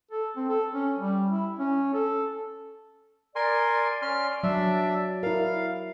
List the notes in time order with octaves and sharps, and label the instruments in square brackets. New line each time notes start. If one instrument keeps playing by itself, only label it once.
[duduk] A4
C4
A4
C#4
G3
E4
C#4
A4
[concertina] A#4 G#5 C6 [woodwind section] D5
[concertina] C#4 C6 F6
[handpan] F#3 [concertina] D4 E5
[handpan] E4 A#4 [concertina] F5